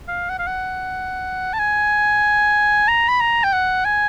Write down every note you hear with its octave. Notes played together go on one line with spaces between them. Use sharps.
F5
F#5
F5
F#5
A5
G#5
A#5
B5
A#5
G5
F#5
G#5